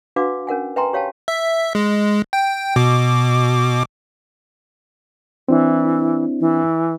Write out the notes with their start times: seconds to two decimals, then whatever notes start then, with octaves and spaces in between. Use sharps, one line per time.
0.16 D4 F#4 B4 F5 F#5 D6
0.47 C#4 A#4 F#5 G#5
0.76 B4 E5 G5 G#5 A#5 C6
0.93 G4 C#5 F5 G5 A5
1.28 E5
1.75 G#3
2.33 G5
2.76 B2 D6
5.48 E3 C4 D4 E4
6.40 E3